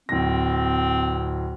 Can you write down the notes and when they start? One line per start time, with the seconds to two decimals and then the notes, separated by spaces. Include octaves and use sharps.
0.09 D1 C4 A#6